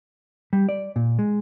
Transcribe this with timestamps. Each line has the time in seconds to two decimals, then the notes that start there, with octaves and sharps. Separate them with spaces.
0.53 G3
0.69 D5
0.96 A#2
1.19 G#3